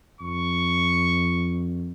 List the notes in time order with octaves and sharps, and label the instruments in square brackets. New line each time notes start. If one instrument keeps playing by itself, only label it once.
[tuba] F2 [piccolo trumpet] C#6